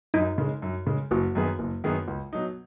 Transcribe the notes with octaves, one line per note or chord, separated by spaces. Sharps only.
F#2 D#4
C#3 G#3
F#2
C#3 G#3
F#1 F#4
F#2 D#3 B3 G#4
F#1
F#2 D#3 B3 G#4
C#2
B2 F#3 D#4